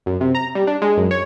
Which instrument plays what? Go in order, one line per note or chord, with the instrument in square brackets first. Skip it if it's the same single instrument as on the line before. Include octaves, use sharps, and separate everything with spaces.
[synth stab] F#2
C3
A#5
G3
D4
G#3
F#2
C#5